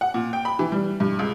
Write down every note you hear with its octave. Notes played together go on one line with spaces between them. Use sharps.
F#5
A#2
G5
B5
E3
G3
G2
C#2